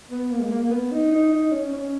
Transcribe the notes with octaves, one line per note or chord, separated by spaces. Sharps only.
B3
A#3
G#3
A#3
A#3
B3
D#4
D#4
D#4
C#4
C#4